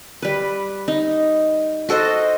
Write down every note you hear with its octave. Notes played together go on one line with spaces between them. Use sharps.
G3 B4
D#4
F#4 A4 C5 D#5